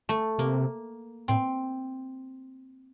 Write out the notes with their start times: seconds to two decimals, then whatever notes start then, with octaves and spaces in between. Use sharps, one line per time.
0.09 A3
0.38 C3 A#3
1.28 A2 C4